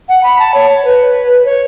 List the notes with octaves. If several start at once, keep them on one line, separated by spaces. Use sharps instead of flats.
F#5
B5
A5
C#5
B4
C#5